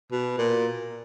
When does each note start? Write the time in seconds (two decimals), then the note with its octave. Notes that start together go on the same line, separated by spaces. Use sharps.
0.12 B2
0.39 A#2